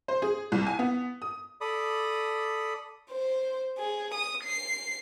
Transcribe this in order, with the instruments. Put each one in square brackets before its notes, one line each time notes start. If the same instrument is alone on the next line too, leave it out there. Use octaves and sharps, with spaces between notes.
[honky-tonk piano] C5
G#4
C2
G#5
B3
D#6
[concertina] A4 D5 B5 D#6
[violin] C5
G#4
D#6
C7